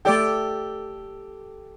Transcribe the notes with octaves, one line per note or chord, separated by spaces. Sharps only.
A3 G4 A4 D5 G5